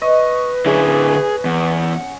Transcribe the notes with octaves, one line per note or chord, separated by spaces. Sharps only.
B4 D#5 C#6
D3 C#4 E4 G#4
E2 F#5